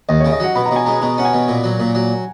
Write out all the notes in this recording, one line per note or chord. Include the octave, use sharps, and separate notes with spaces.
D#2 D#5
C#3 C#5
D#5
F#3 F#5
B2 B5
A#5
B2 G#5
G#3 A#5
B2 A#5
C#4 F#5
G#5
B2
A#2
F#3
A#2
F#3